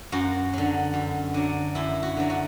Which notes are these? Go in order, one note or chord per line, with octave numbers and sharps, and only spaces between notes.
F#2 F#4
D3 F#3
F#2
D3 F#3
F#2 E4
F#4
D3 F#3
F#4